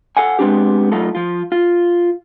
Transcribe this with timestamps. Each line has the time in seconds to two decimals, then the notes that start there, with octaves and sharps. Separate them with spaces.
0.17 A4 F5 F#5 G#5
0.39 G#3 B3 C4 D4 G4
0.92 F#3 A3 D#4 F4 A4
1.15 F3 F4
1.52 F4